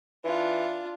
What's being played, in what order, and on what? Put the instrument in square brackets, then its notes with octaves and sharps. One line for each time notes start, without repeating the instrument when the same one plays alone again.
[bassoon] E3 [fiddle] D4 F4